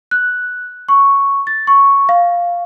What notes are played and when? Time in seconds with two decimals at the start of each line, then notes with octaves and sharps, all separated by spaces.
0.11 F#6
0.89 C#6
1.47 A6
1.67 C#6
2.09 F5